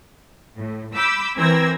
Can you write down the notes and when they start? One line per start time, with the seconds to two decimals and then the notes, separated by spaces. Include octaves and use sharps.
0.58 A2
0.95 B5 D6 E6 G6
1.38 E3 C4 A#4 E6 G#6 A#6